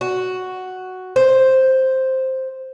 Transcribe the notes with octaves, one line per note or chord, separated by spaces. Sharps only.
F#4
C5